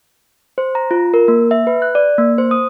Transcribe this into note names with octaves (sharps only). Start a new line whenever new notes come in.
C5
A#5
F4
A#4
A#3
E5
B4
F#6
D5
A#3
C5
D#6